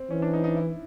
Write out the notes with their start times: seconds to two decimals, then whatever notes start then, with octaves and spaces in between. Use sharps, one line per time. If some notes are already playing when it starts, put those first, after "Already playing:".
Already playing: C4
0.10 E3 C#4
0.22 D4
0.33 D#4
0.44 D#4
0.56 E4